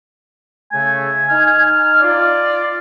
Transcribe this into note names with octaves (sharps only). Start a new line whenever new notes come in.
C#3 A3 G#5
D#4 F6
F4 D5